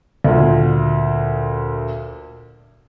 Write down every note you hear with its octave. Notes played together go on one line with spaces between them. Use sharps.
D2 A#2